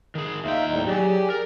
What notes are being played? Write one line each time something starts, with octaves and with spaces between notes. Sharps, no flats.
D#3 G#4
D#2 D#4 F4 E5 G5
A2 G3 D#4
F#3 G4 G#4 D5
A#4